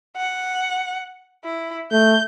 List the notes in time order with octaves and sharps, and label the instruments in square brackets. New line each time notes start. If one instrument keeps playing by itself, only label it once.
[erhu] F#5
E4
[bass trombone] A3 [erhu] G6